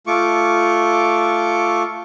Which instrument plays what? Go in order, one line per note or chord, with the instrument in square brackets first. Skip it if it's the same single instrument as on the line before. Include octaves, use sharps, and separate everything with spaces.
[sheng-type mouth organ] A3 F4 C#6 D6